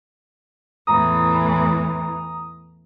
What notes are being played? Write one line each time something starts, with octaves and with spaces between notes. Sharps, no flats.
E2 A2 E3 A#5 D#6